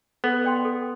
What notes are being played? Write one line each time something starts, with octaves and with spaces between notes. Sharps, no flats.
B3 A4
D5 G5 C6
A4